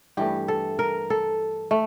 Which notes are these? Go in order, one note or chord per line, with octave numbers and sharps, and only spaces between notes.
G2 E3 A3 G4
A4
A#4
A4
A3